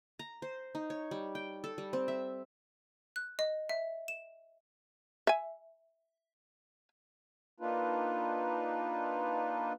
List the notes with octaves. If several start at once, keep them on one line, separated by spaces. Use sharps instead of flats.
A#5
C5
D#4
C#5
G3
G5
A4
G3
C4
E5
F#6
D#5
E5
E7
E5 G#5
A#3 D4 D#4 F4 B4